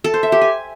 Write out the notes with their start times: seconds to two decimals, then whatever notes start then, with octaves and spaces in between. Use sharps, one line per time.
0.04 A4
0.14 C5
0.23 E5
0.32 G4
0.41 G#5